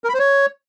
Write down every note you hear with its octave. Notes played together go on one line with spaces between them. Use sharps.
A#4
B5
C5
C#5